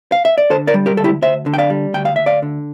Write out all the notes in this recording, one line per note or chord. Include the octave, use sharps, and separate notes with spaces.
F5
E5
D5
D3 A4 C5
A#4 D5
G3
G4 A#4
D2 A4
E4 G4
D2 C5 E5
D3
G5
D5 F5
G3
D2 G5
F5
D2 E5
D5 F5
D3